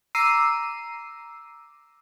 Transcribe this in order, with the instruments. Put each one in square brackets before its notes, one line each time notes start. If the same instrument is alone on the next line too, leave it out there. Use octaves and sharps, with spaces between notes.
[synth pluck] A#5 D6 E6 C7 D#7